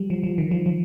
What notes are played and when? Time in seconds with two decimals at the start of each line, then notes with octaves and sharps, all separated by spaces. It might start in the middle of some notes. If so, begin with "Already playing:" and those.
Already playing: F3 G3
0.10 F3
0.23 F3
0.38 D#3
0.51 F3
0.66 F3